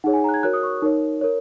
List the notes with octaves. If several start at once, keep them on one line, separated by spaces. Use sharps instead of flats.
D#4 G#4 C#5 F#5
G#5
A#5
F#6
G#6
F#4 A#4 C#5 F#6
D#6
C#6
D#4 A#4 C#5
A#4 C#5